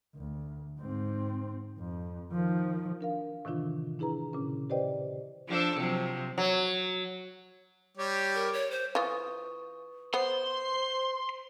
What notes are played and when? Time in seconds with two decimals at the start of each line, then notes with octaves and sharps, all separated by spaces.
0.16 D2
0.79 G#2 C4
1.78 F2
2.32 D#3 F3
3.01 D4 A#4 F5
3.45 A2 C3 D#3 E3 D4 F4
3.99 D4 E4 G#4 B4 A#5
4.33 A#2 C#3 C#4
4.70 G4 B4 C5 D5 D#5 G5
5.48 F3 D4 A4
5.76 C3 F3 F#3
6.38 F#3
7.97 G3 G4 C#5
8.35 A#4
8.53 C#5
8.71 C5
8.95 E3 F4 B4 C#6 D#6
10.14 B3 C5 C6